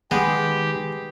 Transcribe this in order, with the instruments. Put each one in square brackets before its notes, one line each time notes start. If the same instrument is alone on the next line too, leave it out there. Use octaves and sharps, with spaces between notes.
[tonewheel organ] D#3 [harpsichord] G#3 [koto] B3 [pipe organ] G4